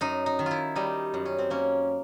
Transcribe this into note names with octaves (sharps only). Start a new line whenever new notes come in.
F#2 D#4
D#4
D#3
E4 F4
G3 D#4
F#2
C#4
C4
A#3 C#4